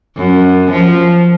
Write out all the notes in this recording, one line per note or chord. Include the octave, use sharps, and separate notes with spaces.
F#2
F3